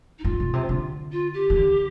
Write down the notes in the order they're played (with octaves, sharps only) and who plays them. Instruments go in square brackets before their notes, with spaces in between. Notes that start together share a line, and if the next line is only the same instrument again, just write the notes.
[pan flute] D#4
[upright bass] G#2 [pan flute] F4
[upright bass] B2
C3
D3
[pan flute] F4
G4
[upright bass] D#3
D3